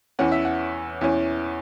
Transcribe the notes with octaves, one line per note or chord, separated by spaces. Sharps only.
E2 E3 C#4 F#5
E5
F#5
E2 E3 C#4